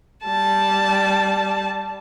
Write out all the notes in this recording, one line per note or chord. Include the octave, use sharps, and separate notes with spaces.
G3 A5